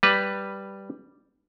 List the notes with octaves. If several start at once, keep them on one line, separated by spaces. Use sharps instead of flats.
G3 B4